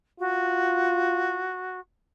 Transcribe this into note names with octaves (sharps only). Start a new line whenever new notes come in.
F4 F#4